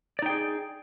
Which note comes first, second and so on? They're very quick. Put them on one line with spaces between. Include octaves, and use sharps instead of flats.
D5 D#4 G5 G#4